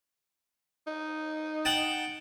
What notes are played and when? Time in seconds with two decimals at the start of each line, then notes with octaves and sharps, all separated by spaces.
0.87 D#4
1.65 F#5 G5 A5